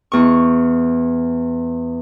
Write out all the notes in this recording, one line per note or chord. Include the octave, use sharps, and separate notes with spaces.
E2 C#6